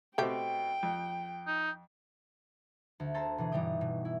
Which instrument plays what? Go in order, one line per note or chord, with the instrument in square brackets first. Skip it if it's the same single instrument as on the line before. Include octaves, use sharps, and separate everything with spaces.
[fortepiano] B2 C4 [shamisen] A3 G4 [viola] G5
[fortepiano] F2
[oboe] D#4
[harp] D2
G#4 A4 C5 A5 A#5
B2 E3 G#4
G1 E3 G3 D#4 G5 D#6
B2
E4